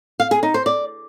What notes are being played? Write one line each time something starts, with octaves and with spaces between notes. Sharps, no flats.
F5
G#4
D#4
C5
D5